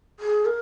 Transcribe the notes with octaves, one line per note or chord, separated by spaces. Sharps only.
G#4
A#4